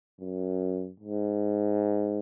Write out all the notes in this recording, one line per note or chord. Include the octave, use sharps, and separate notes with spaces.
F#2
G#2